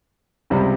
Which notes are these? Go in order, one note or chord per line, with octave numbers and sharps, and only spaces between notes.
C#2 C3 G3